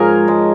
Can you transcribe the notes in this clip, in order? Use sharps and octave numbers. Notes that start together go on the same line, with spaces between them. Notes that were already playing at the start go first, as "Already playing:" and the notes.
Already playing: G#2 F3 C#4 G#4 A#4
G#3